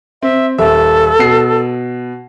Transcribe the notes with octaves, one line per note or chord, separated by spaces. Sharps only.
C4 E5
D#1 A4 E5
B2 C7